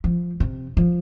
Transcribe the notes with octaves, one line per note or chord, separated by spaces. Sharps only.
F3
C3
F3